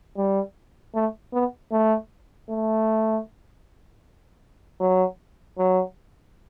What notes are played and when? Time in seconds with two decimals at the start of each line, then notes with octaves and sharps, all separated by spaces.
0.17 G3
0.95 A3
1.33 B3
1.72 A3
2.50 A3
4.81 F#3
5.58 F#3